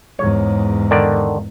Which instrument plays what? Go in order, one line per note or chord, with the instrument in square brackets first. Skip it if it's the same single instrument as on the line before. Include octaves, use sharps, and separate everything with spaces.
[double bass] E2 G#2 [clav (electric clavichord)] C#5
[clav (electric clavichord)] D3 D#3 D5